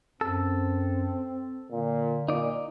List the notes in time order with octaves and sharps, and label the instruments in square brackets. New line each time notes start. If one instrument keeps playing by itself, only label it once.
[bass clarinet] F#2 [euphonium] C4 [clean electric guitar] A4
[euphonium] A#2 [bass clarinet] D3
[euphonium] A#2 [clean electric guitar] D#4 D5